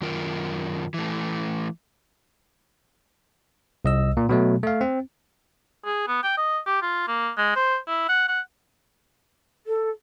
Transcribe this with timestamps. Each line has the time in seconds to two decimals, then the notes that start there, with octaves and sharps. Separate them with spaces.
0.01 F#2 D#3 F4 A#4
0.94 E3 A3
3.85 C2 D#5 E6
4.17 A#2
4.29 B2 F#3 A3
4.63 A3 F5
4.81 C4
5.84 G#4
6.07 B3
6.23 G5
6.37 D#5
6.66 G4
6.82 F4
7.08 A#3
7.37 G#3
7.56 C5
7.88 E4
8.08 F#5
8.28 F#5
9.66 A4